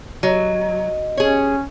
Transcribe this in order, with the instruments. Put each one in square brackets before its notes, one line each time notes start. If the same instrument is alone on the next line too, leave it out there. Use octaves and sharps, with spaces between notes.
[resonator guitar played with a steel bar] F#3 [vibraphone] D#5
[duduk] C#4 [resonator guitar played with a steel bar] G#4 C#5